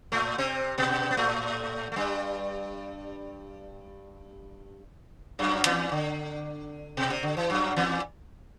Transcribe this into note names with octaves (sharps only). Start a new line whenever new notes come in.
A2 A3
C3 C4
B2 B3
B3
A2 A3
A3
G2 G3
F#2 F#3
E2 E3
D3
B2
C3
D3
E3
F#2 F#3
E2 E3